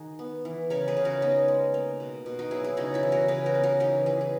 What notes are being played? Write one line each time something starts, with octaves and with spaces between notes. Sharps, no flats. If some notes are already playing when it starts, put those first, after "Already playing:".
Already playing: D#3 D#4 F#4 G#4
B3
E3
C#3 A#4 C#5
G#4 B4
C#3
F#4 A#4
B3 D#4
G#3
A#3
B2
B2
D#4 F#4
F#3 E4 G#4
E4 G#4
C#3 D#4 F#4
E4 G#4
E3
F#4 A#4
C#3 G#4 B4
F#4 A#4
B3
F#4 A#4
E3 D#4 F#4
E3 G#4 B4
G#4